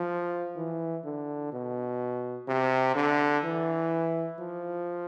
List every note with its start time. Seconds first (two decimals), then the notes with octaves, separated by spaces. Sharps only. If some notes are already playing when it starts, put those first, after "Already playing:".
Already playing: F3
0.56 E3
1.04 D3
1.52 B2
2.48 C3
2.95 D3
3.43 E3
4.39 F3